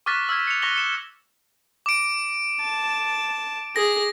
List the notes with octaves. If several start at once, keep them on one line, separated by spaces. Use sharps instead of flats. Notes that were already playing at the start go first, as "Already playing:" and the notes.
C#6 D6 F6 F#6 A6 B6
E6 F6 G#6 B6
C#7 F7
C#6 F#6 A#6 B6 F7 G7
C#7 E7
D6 D7
A5
G#4 A#6